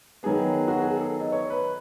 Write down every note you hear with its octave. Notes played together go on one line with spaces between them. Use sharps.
D#3 F#3 B3 G#4
F#4
G#4
A4
D#5
C#5
B4